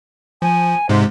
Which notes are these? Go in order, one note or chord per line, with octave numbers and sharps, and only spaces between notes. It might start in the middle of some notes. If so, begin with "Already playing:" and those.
F3 G#5
G#2 C3 G#3 C5